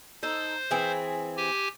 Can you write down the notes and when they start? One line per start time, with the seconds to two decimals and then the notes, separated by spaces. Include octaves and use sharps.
0.23 D#4 A4 C5
0.71 E3 C4 G#4
1.37 G4 G#5